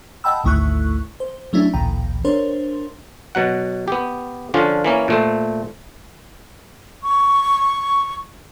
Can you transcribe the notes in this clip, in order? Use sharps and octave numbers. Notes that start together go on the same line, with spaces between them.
D#5 F#5 G5 A5 B5 E6
G#1 D2 A3 E4 C#6 F#6
C5
F#3 A3 C#4 D4 E4
A1 D2 A#2 E3 G5 A#5
D4 A#4 C5 C#5 C6
B2 F#3 F#5
B3 G4
D3 F3 C#4 D4 F4
E3 A#3 C#4
A#2 A3 C5
C#6